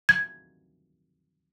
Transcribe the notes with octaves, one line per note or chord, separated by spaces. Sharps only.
G#6